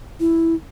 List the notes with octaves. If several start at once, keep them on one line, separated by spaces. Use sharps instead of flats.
E4